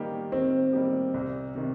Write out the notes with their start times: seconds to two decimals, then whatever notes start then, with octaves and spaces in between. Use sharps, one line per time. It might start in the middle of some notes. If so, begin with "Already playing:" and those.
Already playing: D#3 G3 A#3 D#4 G4
0.32 D#3 C4
0.73 G3 A#3 D#4 G4
1.14 C2
1.55 C3 D#3